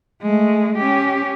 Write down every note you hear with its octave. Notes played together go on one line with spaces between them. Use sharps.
G#3 A3
C#4 G4